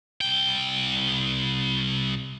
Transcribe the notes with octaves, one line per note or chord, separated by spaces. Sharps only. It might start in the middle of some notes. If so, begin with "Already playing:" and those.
C2 G5